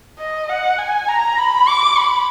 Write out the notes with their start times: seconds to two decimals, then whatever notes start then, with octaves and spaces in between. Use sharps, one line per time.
0.19 D#5
0.49 F#5
0.78 G#5
1.08 A#5
1.38 B5
1.68 D6
1.98 B5